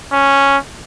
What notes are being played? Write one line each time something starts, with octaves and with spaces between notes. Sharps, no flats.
C#4